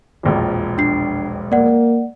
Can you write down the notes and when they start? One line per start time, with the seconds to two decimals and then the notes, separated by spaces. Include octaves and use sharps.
0.23 E1 A#1 F2
0.78 D4 C7
1.52 A#3 D5 F#5